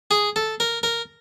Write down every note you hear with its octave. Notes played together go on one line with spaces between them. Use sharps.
G#4
A4
A#4
A#4